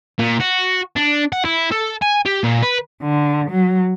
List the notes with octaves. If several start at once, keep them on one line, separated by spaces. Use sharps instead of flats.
A#2
F#4
D4
F#5
E4
A4
G#5
G4
A#2
B4
D3
F#3